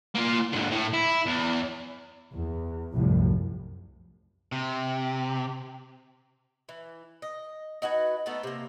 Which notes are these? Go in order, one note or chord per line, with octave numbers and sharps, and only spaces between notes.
A#3 F4
G#2 D3
A2
E4
E2
E2
C2 F#2 A2 F3
C3
E3
D#5
D#4 F#4 B4 G#5
A3 B3 D#4 A4
C3 A#3